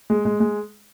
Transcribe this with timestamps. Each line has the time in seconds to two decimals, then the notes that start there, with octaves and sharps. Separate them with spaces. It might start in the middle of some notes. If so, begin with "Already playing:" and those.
0.10 G#3
0.25 G#3
0.40 G#3